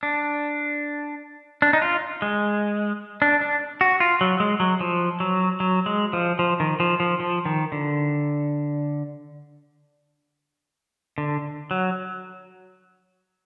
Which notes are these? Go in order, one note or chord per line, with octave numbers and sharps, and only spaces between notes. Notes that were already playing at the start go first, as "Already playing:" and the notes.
D4
D4
D#4
F4
G#3
D4
D4
F#4
F4
F#3
G#3
F#3
F3
F#3
F#3
G#3
F3
F3
D#3
F3
F3
F3
D#3
D3
D3
F#3